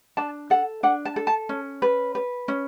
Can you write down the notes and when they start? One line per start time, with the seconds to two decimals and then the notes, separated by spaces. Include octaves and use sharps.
0.17 D4 A5
0.50 A4 F#5
0.83 D4 F#5
1.05 A5
1.16 A4
1.27 A5
1.49 C#4
1.82 B4
2.15 B4
2.48 C#4